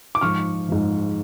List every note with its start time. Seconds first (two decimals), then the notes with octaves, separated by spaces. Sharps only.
0.15 D6
0.21 G#2 F3 C#6 F6
0.69 G#2 F3